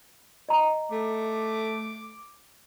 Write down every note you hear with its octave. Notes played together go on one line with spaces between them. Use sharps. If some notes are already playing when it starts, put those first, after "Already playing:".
D#5 A#5
A3 D6